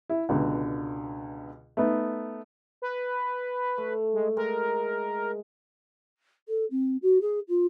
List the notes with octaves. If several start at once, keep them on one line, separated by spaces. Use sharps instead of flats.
E4
C#2 B2 D3
A3 B3 D#4
B4
A3
G#3
G#3 A#4
A4
C4
F#4
G#4
F4